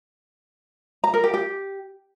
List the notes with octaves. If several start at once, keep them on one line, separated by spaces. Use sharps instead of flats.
A#5
A#4
G4
G4